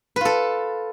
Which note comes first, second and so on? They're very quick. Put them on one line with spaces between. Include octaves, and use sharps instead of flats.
B4 F4 A4